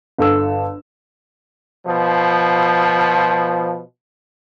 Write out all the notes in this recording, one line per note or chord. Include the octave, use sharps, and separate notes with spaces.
G1 A4 E6
B2 F3